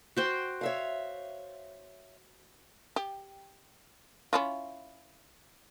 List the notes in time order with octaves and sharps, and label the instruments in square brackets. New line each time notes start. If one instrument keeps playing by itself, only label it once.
[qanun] F#4 C5 G5
[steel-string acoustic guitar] C#5 E5 F5
[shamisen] G4
C#4 E4 F4